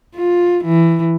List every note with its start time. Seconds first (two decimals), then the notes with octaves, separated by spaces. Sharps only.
0.16 F4
0.65 E3